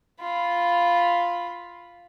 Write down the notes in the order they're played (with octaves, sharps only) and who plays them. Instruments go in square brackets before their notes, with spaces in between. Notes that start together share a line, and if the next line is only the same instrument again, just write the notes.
[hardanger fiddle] F4 B5